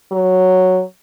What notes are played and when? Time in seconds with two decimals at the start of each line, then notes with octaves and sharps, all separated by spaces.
0.12 F#3